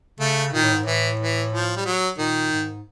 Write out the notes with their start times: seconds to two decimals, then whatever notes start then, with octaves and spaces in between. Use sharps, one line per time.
0.19 C#3 A3
0.53 A#2 D#3
0.63 A2
0.73 G#2
0.84 A2 E3
1.19 E3
1.53 F3
1.76 G3
1.85 F#3
2.18 A#2 D#3
2.51 G#2